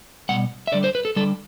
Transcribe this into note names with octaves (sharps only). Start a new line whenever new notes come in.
B2 G3 F#5
E5
D3 G3 D5
C5
B4
A4
D3 G3 A4